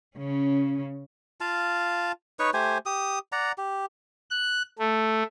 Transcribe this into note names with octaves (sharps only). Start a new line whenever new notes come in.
C#3 C#4
F4 F5 A5
D#4 B4 C#5 C#6
A3 G4 C5 G#5
G4 D#6
D5 F#5 A#5
G4
F#6
A3